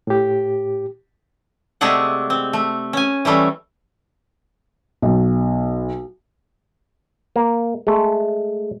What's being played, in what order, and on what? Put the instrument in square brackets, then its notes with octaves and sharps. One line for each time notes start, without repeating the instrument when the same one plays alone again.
[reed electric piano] A2 G4
[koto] C3 G#3 A3 G#4 D5 F#5
C4
A3
C#4 G#5
E3 G3 A3 C#4
[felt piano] B1
[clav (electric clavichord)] A#3
G#3 A3